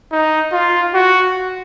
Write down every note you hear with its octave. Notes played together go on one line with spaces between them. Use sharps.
D#4
F4
F#4